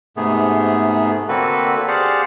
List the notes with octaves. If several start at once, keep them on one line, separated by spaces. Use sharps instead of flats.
G#2 C3 A3 B3 G#4
D3 A#3 C4 F#4 A4 B4
G4 G#4 C5 D5 F5 F#5